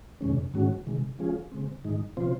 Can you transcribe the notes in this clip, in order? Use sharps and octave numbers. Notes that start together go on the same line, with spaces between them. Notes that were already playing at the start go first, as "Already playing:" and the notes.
F2 C3 D#3 G#3 C#4
G#2 D#3 G#3 C#4 F#4
C3 D#3 G#3
F3 G#3 C#4 F4 G#4
C#3 G#3 C4
G#2 D#3 G#3 D#4
C3 F3 C4 F4 C5